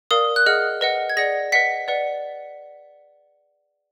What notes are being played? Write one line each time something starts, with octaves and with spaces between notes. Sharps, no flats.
A#4 D5 F5 D#6
F#6
G#4 D#5 F#5 F6
B4 D#5 F#5
G#6
G#4 D5 F#5 A#6
B4 D#5 F#5 B6
B4 D5 F#5